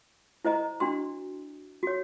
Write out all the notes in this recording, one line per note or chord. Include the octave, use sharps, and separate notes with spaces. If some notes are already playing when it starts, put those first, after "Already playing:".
E4 C5 D#5 A#5
D4 F#4 C6
F#4 C#5